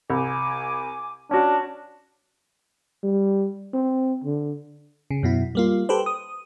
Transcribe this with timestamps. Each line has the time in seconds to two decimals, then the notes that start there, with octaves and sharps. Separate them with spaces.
0.10 C2 G#5 D6
1.31 C#4 D4 F#4
3.03 G3
3.74 C4
4.24 D3
5.10 C#3
5.23 F#2 B2 E4
5.55 G3 A#3 F4
5.89 G4 A4 B4 C5
6.06 D#6